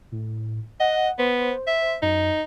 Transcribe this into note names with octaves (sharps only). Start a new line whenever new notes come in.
A2
D#5 F#5
B3 C5
E5
F#2 D#4